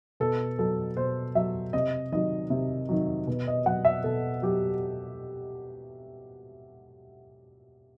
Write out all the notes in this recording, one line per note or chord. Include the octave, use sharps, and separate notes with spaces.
B2 A4
F#3 A4
B2 C5
F#3 E5
C3 D#5
D#3 F#3 D#5
C3
D#3 F#3
B2
D#5
F#3 F#5
E5
B2 A4
F#3 G4